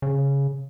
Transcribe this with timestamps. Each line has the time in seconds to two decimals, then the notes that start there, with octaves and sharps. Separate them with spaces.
0.02 C#3